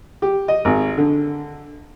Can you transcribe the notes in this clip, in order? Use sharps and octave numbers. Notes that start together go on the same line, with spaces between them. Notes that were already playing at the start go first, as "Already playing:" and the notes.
G4
D#5
G#1
D3